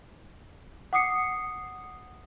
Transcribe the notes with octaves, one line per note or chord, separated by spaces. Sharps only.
F#5 D6 D#6 C7 C#7